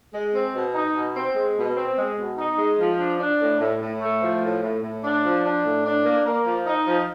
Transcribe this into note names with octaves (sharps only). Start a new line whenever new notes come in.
G#3
C4
B2
D#4
B2
C4
G#3
B2
C4
G#3
B2
D#4
G#3
F3
D4
D4
A2
A2
A2
A3
F3
A2
A2
A2
D4
F3
D4
A2
D4
A#3
A#3
F3
D#4
F3